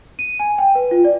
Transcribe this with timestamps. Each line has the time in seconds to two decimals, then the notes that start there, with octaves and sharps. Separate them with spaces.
0.19 D#7
0.40 G#5
0.58 G5
0.75 B4
0.91 F4
1.05 D5